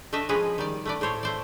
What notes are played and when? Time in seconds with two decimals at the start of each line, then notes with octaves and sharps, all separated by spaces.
0.13 A3 D4 D#5 E5 A5
0.29 F3 G#3 C#4 G#4 B4 D#5
0.58 D#3 G3 D5
0.85 A3 B4 D5
1.01 A2 A3 C5 C#5
1.23 A3 C5 D5